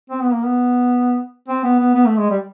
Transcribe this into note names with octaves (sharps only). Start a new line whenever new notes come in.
C4
B3
A#3
B3
C4
B3
B3
B3
A3
G#3
G3